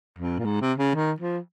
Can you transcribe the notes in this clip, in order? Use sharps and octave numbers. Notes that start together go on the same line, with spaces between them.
F2
A#2
G#2
C3
C#3
D#3
F3